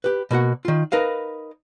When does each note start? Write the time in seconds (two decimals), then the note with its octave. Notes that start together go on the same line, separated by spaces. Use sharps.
0.04 G4 B4
0.31 B2 A#3 F#4 F#5
0.65 D#3 F4
0.92 D#4 A#4 B4 F5